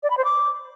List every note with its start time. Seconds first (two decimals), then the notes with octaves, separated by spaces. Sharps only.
0.03 D5
0.10 B5
0.17 C5
0.24 D6